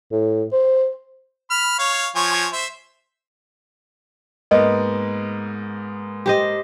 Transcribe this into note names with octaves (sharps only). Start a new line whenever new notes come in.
A2
C5
B5 F6
C#5 F5
F3 C#5 G#5
C5 E5
G#2 A#3 B3 D#5
G4 C5 D#5